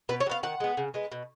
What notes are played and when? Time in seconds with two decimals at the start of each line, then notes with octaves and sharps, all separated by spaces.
0.09 B2 B4
0.20 C#5
0.26 F#3
0.29 B3 F5
0.43 D#3 F#5
0.60 G#3 B3
0.77 C#3
0.94 G#3 B3
1.12 B2